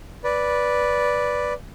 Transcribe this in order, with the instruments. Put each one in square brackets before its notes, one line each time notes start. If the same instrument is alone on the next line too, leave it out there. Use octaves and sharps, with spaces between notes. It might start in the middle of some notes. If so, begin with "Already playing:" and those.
[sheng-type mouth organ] B4 D5